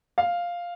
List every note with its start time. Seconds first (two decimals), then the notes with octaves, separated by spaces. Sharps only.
0.18 F5